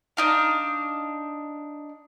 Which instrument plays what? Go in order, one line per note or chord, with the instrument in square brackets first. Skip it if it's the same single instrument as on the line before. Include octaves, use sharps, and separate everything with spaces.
[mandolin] D4 D#4 F5